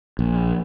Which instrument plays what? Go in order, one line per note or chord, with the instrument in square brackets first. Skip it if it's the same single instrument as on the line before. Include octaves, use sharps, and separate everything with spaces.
[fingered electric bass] A#1